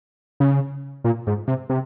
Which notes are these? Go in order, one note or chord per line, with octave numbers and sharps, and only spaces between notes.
C#3
A#2
G#2
C3
C3